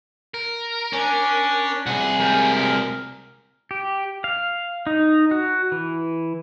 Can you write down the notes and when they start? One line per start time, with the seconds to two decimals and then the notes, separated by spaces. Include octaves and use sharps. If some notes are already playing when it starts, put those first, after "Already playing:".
0.34 A#4
0.93 C#4 D4
1.86 C2 G#4 F#5
2.20 G#3 G4 A#4
3.71 G4
4.24 F5
4.87 D#4
5.31 F#4
5.72 E3